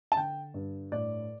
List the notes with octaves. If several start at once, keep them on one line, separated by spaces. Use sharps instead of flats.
A5
D3 G5
G2
A2 D5